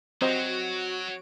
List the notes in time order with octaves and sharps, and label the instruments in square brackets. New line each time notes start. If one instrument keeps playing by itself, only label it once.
[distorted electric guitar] F#3 [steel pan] C4 C5 D#5 [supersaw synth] F#4 D7